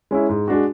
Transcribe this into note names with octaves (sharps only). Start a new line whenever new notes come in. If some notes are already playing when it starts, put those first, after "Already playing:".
G#3 C#4 E4
G#2
G#3 D4 F#4